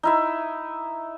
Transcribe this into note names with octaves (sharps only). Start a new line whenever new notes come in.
D#4 E4 E5